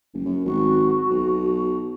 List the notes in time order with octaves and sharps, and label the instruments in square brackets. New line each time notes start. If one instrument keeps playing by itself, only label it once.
[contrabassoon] F#1
F#2
[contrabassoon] G#1 [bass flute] F#4
[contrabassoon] B1